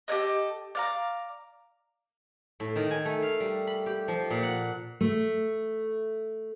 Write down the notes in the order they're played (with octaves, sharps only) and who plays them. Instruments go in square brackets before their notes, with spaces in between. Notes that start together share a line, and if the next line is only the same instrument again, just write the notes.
[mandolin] G4 A4 C#5 D#5
D5 F5 A#5
[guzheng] A2
D#3
G#5
A3
F5
G3
B5
G4
F3
A#2
F#5
[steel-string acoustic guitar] A3